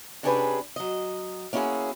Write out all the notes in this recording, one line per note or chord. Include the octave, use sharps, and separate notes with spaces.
C3 C#4 D4 G4 G#4 B4
F#3 D#5
A#3 C#4 E4 F#4 G#4